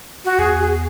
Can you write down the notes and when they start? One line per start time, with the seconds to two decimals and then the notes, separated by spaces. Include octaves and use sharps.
0.25 F#4
0.38 E2 G#4
0.59 G#4